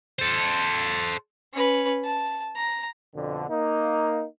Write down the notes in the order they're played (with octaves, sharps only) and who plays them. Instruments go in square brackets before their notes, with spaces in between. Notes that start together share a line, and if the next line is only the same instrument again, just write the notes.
[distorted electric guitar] A4 C5
[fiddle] C#4 B4
A5
A#5
[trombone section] F2 B2 D3
A#3 D#4